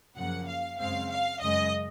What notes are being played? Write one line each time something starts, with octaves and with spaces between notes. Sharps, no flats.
F#2 C#3 F3 A#3 F#5
F5
F#2 C#3 G#3 C4 F5
F5
F#2 C#3 G#3 D#5